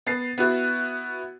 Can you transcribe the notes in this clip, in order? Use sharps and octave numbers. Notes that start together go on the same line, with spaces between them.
B3 A6 C7
B3 E4 F#4